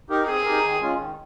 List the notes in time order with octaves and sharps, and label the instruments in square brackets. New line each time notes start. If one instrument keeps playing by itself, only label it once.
[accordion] D#4 G4 A#4
[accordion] C4 [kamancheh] G#4
[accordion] D#4 G4 A#4
D#3
G#3 C#4 F4
D#3